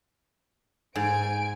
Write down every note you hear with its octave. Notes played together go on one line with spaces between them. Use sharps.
G#2 G#5 D7